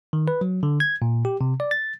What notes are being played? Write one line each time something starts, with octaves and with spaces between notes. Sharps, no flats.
D#3
B4
F#3
D3
G#6
A#2
G4
C3
D5
A6